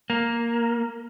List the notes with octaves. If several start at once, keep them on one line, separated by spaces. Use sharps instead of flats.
A#3